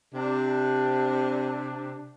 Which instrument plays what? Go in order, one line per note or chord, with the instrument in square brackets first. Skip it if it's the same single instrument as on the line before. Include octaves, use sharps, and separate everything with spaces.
[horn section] C3 D4